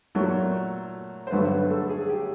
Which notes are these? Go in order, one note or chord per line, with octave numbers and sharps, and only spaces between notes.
A#2 F#3 A3 A#4
C5
G2 D3 F#3 A3 B4
B4
A4
G#4
G4